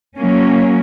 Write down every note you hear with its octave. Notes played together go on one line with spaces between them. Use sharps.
F#3 A#3 C#4